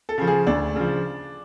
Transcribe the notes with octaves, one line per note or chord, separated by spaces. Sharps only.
A4
C#3 F3
G#4
D2 D4
C#3 F3